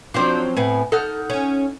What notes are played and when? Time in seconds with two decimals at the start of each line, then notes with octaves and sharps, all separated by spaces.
0.14 F3 F#3 C4 D4 C5 D5
0.57 A2 B3 G#5
0.92 D#4 A4 F#5 F6
1.30 C#4